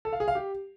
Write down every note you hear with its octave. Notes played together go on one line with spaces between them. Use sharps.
A4
F5
G#4
F5
G4